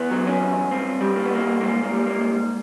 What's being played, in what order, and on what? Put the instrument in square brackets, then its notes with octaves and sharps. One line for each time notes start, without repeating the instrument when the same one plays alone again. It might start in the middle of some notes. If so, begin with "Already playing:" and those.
Already playing: [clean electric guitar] E2 B3
F#3
C#4
E2
G2 C4
G3
A#3
B3
G2 A#3
G#2 A#3
A#3
G3
A#3
G#2